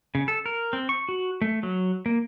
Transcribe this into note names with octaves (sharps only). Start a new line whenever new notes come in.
C#3
A4
A#4
C4
C#6
F#4
A3
F#3
A#3